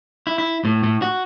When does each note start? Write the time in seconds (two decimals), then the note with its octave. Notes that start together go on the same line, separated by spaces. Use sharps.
0.27 E4
0.38 E4
0.65 A2
0.83 A2
1.02 F#4